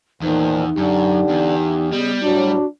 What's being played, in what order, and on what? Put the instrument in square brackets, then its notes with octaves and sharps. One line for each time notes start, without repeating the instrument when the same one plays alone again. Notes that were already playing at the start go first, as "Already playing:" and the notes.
[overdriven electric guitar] E2 [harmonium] A#2 D#3 F3 [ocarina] D#4
[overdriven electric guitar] F#2 [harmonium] D3 D4 [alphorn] G4
[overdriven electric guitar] E2
[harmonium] C#3 D#5 [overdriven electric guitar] G3 [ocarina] B3
[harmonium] A2 F#3 [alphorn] D4 [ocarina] F#4